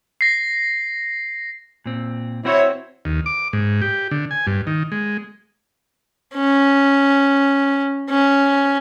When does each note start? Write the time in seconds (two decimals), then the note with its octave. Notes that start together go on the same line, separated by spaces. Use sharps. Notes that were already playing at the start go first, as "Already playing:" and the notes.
0.21 A#6 C7
1.86 A#2 C4
2.45 C4 E4 F#4 C5 C#5
3.05 D#2
3.26 D6
3.53 G#2
3.82 G4
4.11 D3
4.31 G#5
4.47 G2
4.67 D#3
4.92 G#3
6.34 C#4
8.09 C#4